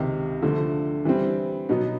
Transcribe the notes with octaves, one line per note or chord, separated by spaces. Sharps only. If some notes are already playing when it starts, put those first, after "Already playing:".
Already playing: C#2 C3 D#3
D3 F3 A3
E3 G3 C4
B2 F#3 B3 D#4